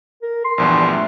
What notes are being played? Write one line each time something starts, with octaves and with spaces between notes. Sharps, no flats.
A#4
C6
A#1 E2 G2
A3